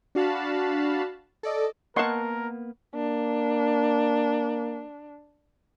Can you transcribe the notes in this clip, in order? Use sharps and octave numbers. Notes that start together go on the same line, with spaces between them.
D4 F#4 F5 A5 B5
A4 D5 D#5
A#3 B3 A#4 D#5 F#5 A5 C6 C#6
A#3 D4